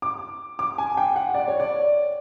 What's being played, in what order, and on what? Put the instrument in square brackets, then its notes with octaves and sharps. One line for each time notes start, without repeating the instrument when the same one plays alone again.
[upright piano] D6
D6
G#5
G5
F#5
D5
C#5
D5